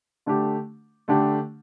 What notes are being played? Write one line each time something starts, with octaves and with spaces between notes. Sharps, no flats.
D3 A3 D4 G4
D3 A3 D4 G4